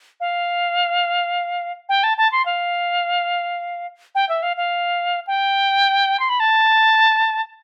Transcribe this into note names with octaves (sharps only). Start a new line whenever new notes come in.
F5
G5
A5
A5
C6
F5
G5
E5
F5
F5
G5
C6
B5
A5